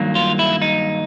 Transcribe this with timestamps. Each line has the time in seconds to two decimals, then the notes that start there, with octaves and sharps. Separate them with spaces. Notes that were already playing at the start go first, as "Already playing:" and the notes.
Already playing: G2 D#3 F#3 A#3
0.15 F4
0.39 E4
0.62 D#4